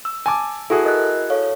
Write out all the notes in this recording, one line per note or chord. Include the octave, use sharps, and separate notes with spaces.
E6
G#5 A5 D6
E4 F#4 G#4 A4
A#4 D#5 F#6
A4 C#5 F5